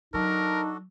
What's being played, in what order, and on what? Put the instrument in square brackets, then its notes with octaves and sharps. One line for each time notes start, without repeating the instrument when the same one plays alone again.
[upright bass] F#3 [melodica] D4 F#4 A4 [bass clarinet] D#4 [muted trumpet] A#4